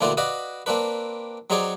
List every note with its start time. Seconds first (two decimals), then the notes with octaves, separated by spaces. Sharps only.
0.01 D2 A#2 E3 F4 F#4 D5
0.17 F#4 B4 D5 D#5 F5
0.66 A#3 C4 D4 B4
1.50 F#3 C4 D#4 G#4 C#5 D5